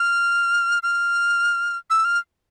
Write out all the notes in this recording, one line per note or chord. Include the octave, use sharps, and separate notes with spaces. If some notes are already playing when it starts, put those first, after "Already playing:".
Already playing: F6
F6
E6
F6